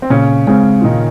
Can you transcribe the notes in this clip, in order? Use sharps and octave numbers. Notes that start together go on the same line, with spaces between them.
C4
A#2 C#3 C#4
C#3 G#3 C4 C#4
F4
A#2 D#3 D#4